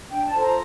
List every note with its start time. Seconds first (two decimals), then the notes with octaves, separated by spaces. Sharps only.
0.10 D4 G5
0.25 A5
0.34 F4 A4 C5
0.42 A#5